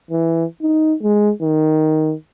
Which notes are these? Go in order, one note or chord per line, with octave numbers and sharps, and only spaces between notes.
E3
D#4
G#3
D#3